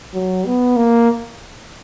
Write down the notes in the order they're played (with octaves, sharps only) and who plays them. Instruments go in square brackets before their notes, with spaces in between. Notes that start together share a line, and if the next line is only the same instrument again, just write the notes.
[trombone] F#3
B3
A#3